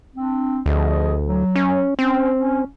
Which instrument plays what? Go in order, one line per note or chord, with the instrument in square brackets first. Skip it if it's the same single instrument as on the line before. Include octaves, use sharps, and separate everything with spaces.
[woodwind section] C4 D4
[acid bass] D2 [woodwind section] F3 G#4 D#5
[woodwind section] F#3
[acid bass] C#4
[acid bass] C4 [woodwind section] C#4
[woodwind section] C#4